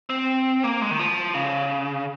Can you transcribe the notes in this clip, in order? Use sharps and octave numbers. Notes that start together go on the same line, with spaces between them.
C4
A#3
G#3
D#3
F3
C#3